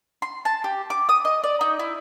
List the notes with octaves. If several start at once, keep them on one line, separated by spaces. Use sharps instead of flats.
C6
A5
G4
D6
D#6
D#5
D5
D#4
E4